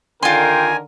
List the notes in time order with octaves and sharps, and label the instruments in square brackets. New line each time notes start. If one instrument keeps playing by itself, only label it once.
[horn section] D3 D#3 A#4 [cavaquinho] F4 C6 [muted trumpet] G5 [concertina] G#5